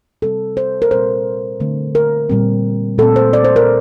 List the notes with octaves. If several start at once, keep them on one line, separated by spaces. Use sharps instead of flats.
C3 G3 C4 A4
C5
A#4
A#2 G3 C4 C5
D3 A3 C4
A#4
A#2 G3 C4
A#2 A3 C4 A4
C5
D5
C5
A#4